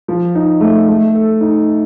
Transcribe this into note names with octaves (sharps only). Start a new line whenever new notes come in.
F3
D#4
A3
A3
A4
D#4